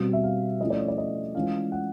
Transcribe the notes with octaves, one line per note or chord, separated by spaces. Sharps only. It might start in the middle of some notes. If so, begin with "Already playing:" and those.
Already playing: B2 G3 C4
E5
F5
F3 A3 C#4 E4 D#5
D5
C#5
D5
D#5
E3 G#3 C#4 F4 F5
F#5